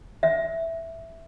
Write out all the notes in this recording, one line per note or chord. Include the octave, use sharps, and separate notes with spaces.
E5